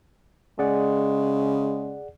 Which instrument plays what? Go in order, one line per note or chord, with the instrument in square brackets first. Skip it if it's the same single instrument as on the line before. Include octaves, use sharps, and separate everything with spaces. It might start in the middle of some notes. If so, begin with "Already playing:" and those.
[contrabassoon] C#3 [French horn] G#3 [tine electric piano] G#4 D5 F#5